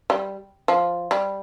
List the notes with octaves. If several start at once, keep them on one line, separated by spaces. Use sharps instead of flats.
G3
F3
G3